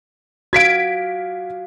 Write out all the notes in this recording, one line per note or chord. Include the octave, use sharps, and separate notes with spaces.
F#4 F5 G#6 B6 D7